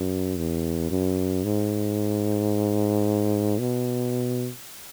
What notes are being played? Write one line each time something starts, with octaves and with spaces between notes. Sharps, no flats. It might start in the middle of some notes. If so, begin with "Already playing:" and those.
Already playing: F#2
E2
F#2
G#2
B2